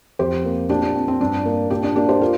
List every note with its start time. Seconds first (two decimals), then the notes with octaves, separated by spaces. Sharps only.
0.19 F2 G4 C5
0.45 A#3
0.69 A#2 D4 G4
0.83 D4
0.95 C4
1.08 C4
1.21 G2 D4
1.45 A#3
1.70 A#2 D4 G4
1.83 D4
1.96 A#3 D4 G4
2.09 G4 C5
2.21 F4 A#4